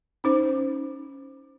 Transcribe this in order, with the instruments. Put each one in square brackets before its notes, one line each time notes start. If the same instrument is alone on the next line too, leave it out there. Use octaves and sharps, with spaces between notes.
[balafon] C#4 D#4 C5